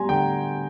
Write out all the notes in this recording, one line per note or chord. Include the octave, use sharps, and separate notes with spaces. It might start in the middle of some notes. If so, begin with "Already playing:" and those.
Already playing: G3 B3 G#5 A#5 C6
D3 G5